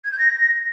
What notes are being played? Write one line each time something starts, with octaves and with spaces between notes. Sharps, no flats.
G#6
G6
A#6